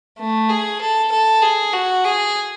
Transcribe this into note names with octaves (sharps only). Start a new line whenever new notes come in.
A3
G#4
A4
A4
G#4
F#4
G#4